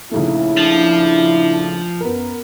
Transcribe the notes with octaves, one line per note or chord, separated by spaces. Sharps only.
A#1 C#3 A3 D#4 E4
F3 D4
F#2 B3 A#4